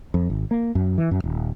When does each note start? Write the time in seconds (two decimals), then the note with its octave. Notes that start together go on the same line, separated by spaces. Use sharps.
0.14 F2
0.30 G#1
0.51 A#3
0.75 F#2
0.98 E3
1.11 F#2
1.24 D#1